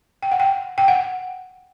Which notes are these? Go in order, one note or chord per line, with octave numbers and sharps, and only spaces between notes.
G5
F#5
G5
G5
F#5